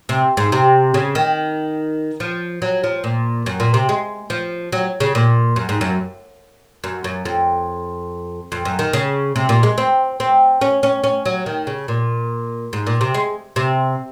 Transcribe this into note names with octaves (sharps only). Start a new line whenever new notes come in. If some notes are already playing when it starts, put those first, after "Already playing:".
C3
G#2
C3
C#3
D#3
F3
F#3
F3
A#2
F#2
A#2
C3
G#3
F3
F#3
C#3
A#2
F#2
G#2
F#2
F#2
F#2
F2
F2
F#2
D#3
C#3
C3
A#2
G#3
C4
C4
C#4
C#4
C#4
F#3
D#3
C#3
A#2
G#2
A#2
C3
G#3
C3